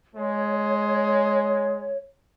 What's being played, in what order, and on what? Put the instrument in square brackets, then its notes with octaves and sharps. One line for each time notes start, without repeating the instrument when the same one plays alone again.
[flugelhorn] G#3 [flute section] C#5